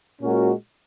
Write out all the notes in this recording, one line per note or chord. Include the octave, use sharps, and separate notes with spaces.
A#2 G#3 C#4 F#4 A#4